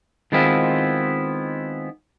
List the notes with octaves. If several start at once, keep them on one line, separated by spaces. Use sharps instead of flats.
D#3 G#3 B3 C4 E4 F4